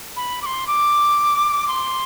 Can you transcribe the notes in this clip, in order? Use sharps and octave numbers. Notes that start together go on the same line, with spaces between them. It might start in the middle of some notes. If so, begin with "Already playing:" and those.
B5
D6
C6
D6
C6